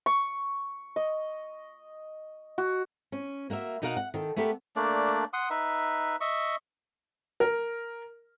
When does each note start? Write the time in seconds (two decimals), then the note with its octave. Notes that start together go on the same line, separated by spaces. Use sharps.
0.06 C#6
0.96 D#5
2.58 F#4
3.12 C#4
3.50 A#3 F#4 A#4 E5
3.82 B2 D#4 F#4 A#4 F5 F#5
3.97 F#5
4.14 D#3 A4
4.36 A3 B3 G4 A4 A#4
4.76 A3 A#3 D4 D5
5.33 F#5 C6 D#6
5.50 D#4 B4 E5
6.21 D#5 E5 C#6
7.40 A#4